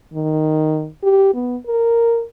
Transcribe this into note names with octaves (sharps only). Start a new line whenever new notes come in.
D#3
G4
B3
A#4